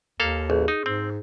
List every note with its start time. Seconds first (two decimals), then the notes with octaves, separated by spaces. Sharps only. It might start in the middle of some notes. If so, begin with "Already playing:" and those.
0.20 D#2 A#3 A4 F5
0.50 A1 G#4
0.68 D#4
0.86 G#2 C4